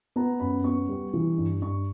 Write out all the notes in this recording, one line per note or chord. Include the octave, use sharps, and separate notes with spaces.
B3 A#5
F#2 B5
B3 C#6
G3
E3
G2
G2 C#6